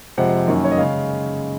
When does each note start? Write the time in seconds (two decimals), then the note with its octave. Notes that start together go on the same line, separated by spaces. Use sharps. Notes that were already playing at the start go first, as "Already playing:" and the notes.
0.17 F2 C3 F3 G#3 F#5
0.47 F#2 D#3 A#3 C#4
0.64 C#5
0.72 D#5
0.78 C#3 G#3 C#4 F5